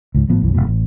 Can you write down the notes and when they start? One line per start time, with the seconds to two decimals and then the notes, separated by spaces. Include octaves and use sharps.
0.15 C#2 G#2
0.28 G#1 A2 F3 B3
0.42 B1 F#2 E3
0.54 F1 A#1 G#2 B2
0.67 A1